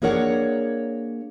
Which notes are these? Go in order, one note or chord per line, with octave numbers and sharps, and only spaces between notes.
A#3 D4 G#4 A#4 C#5 F#5